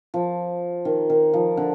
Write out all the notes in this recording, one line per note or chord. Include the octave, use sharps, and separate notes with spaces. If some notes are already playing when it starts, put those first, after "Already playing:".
F3
D#3
D#3
F3
D3